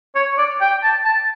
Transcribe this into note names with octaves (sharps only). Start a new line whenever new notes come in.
C#5
D5
G5
A5
A5